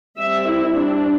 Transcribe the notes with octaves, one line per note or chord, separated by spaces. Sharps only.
G3 C4 E5
E4
D4